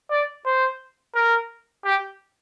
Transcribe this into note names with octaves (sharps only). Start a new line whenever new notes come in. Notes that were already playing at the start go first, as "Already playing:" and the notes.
D5
C5
A#4
G4